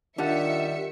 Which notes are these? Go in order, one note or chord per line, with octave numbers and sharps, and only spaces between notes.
D#3 G3 D4 F4 E5 F#5 C#7